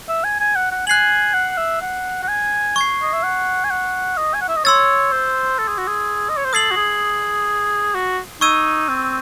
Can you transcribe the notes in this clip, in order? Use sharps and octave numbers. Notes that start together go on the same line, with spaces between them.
E5
G#5
G#5
F#5
F#5
G#5 F#6 C7 F#7
F#5
E5
F#5
F#5
G#5
C#6 G#6 C7
D#5
E5
F#5
G#5
F#5
D#5
G#5
F#5
E5
D#5
C#5 C6 E6 A6
C5
A4
G#4
F#4
G#4
D#5
C#5
C5
A4 D#6 G#6 C7 F#7
F#4
G#4
F#4
D#4 C#6 E6 G#6 D#7
C4